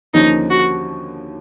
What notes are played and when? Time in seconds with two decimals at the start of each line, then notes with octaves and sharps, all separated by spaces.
0.14 D#2 D3 F3 A#3 C#4 D#4
0.50 F#4